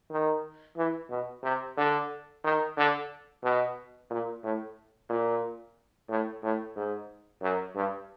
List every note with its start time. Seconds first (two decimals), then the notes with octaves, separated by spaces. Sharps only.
0.11 D#3
0.77 E3
1.10 B2
1.43 C3
1.77 D3
2.44 D#3
2.77 D3
3.44 B2
4.10 A#2
4.44 A2
5.10 A#2
6.10 A2
6.43 A2
6.76 G#2
7.42 F#2
7.76 G2